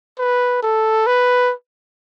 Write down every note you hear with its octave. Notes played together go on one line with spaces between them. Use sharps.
B4
A4
B4